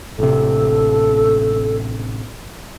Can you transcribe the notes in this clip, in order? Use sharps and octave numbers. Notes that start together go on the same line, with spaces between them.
A1 C3 A4